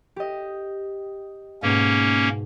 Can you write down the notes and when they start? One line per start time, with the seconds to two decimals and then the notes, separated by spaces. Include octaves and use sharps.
0.16 G4 D#5
1.62 G#2 B2 A#3 C#4